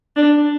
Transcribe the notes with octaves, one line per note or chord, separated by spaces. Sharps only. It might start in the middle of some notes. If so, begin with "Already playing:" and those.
D4